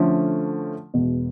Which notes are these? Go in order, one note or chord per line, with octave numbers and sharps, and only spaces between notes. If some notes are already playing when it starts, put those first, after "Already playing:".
Already playing: D3 F3 A3 C#4
E1 E2 B2